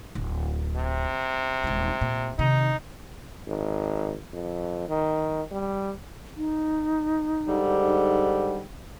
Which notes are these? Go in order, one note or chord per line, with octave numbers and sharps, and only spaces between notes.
D1
C3
D#1 G#3
A#2
C3 D#3 D#4
G#1
F2
D#3
G3
D#4
G#2 D3 G3